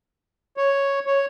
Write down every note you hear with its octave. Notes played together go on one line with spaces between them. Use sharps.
C#5
C#5